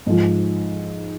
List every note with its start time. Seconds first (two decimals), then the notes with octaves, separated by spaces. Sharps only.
0.07 G#2 F3